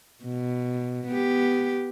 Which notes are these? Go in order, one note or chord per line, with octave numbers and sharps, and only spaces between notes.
B2
B3 G4